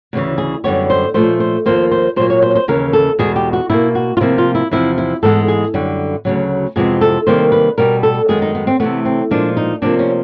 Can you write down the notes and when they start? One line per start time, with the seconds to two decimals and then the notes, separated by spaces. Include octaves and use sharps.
0.13 D2 C#3 E3
0.38 G#4
0.64 F#2 D3 G3 B3 C#5
0.90 C5
1.14 A#2 F3 A3 C5
1.40 C5
1.66 D#2 D3 F3 A#3 C5
1.91 C5
2.16 A#2 F#3 A#3 C5
2.30 C#5
2.42 C5
2.55 C5
2.68 D#2 C#3 E3 A#4
2.93 A4
3.19 E2 B2 G#3 B3 G#4
3.36 G4
3.53 F#4
3.69 B2 G3 A#3 E4
3.95 F#4
4.17 F4
4.21 C3 F3 A#3 E4
4.38 F4
4.55 E4
4.71 E2 C3 F3 E4
4.98 E4
5.23 G#2 E3 G#3 B3 A4
5.48 G#4
5.74 F#2 D3 G3
6.25 D2 C#3 F#3
6.76 F2 C3 E3 G#3 B3 G#4
7.01 A4
7.27 C3 D#3 G3 A#3 C5
7.52 B4
7.78 B2 G3 B3 A#4
8.03 A4
8.28 F#2 D#3 G#3 B3 G#4
8.42 D#4
8.55 B3
8.67 C4
8.80 C3 E3 A3 B3
9.05 C4
9.31 A#2 F3 G#3 D4
9.57 D#4
9.82 C3 F3 A#3 D4
9.99 C#4